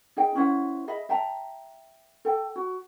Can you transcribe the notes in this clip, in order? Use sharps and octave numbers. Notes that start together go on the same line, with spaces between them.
D#4 G#4 G5
C#4 E4 C5 F#5
G#4 D#5 E5 B5
E5 G5 A5 A#5
A4 G5
F#4